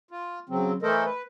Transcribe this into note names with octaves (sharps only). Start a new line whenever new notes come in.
F4
C#3 F#3 C4
E3 A3 A4 A#4 C5 D#5
B4